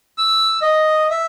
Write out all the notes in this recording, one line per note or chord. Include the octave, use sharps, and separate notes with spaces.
E6
D#5
E5